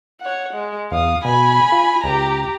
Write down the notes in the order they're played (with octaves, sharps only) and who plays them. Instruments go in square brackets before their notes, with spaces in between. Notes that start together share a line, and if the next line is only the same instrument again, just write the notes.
[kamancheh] C#5 F#5
G#3
[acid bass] E2 [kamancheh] F5 D#6
[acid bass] B2 [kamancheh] G#5 B5
[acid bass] F4
[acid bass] C#2 [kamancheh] G4 A#5